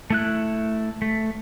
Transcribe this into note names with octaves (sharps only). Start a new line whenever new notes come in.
A3 E4 F#6
A3